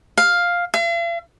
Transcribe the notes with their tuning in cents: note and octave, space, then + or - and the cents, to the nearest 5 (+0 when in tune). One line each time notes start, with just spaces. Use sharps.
F5 +5
F5 -45